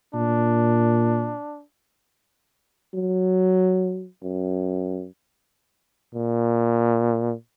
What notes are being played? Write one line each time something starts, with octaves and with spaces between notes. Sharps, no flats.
A#2 D4
F#3
F#2
A#2